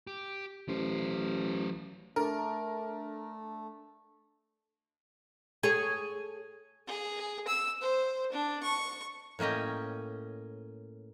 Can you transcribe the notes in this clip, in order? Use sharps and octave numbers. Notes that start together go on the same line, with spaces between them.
G4
A1 F#3 C5
A3 D4 A4 A#4
G#4 A4 C#5
G#4
E6
C5
D4
C#6
A2 A#3 C#4 D#5 G5